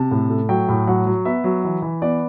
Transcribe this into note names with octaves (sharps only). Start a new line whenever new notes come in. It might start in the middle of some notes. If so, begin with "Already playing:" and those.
Already playing: C3 A5
A2
A3
F#3 G5
A2
F#3 F#5
F#3
B3 E5
F#3
E3
E3
B3 D5